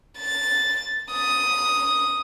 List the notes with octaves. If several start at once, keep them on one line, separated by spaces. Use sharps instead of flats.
A6
D#6